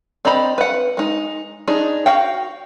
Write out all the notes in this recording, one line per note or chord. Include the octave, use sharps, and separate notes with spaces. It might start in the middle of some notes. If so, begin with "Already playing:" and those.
C4 D5 D#5 A#5 B5
B4 F#5
G#3 D#4
D4 D#4 G#4
F#4 F5 G5